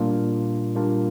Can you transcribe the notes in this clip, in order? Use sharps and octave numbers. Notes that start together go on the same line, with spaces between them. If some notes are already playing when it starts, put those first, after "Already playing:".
Already playing: A#2 G3 A#3 D4 F4
A#2 G3 A#3 D4 F4